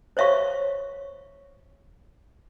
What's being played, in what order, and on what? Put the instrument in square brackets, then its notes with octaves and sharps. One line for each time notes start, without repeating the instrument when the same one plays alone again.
[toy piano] C5 C#5 E5 F5 C#6